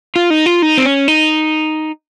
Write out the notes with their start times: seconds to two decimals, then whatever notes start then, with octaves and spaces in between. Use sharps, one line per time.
0.16 F4
0.30 D#4
0.46 F4
0.62 D#4
0.77 C4
0.85 C#4
1.08 D#4